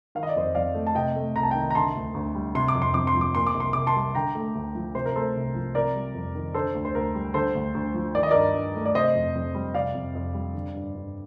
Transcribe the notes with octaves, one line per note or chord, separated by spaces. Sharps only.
D#3 F5
D#5
D5
F2 C5 D#5
F2 D5 F5
A3
A5
C3 D#5 G5
A3
C2 A#5
A5
D#3 G5 A#5
A#5
D3 A5 C6
D2
D2
G3
C3 C6
D6
F2
C6
F2 D6
C6
F3
D6
A#2 C6
D6
C2
C6
C2 D6
A5 C6
G3
D3 G5 A#5
A3
D2
F3
C3 C5
A#4
A3 A4 C5
C2
F3
C3 A#4 D5
G3
F2
D#3
D3 A4 C5
D2
C5
D2 A#4
G3
D3 A4 C5
D2
D2
F3
D#3 D5
D#5
G2 A#4 D5
G2
A3
D5
C3 C5 D#5
F2
F2
G3
C3 D5 F5
F2
F2
G3
D3
G2
G2